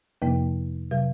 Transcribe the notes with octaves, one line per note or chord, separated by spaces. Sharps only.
F2 C3 F3 A#3
C3 F#3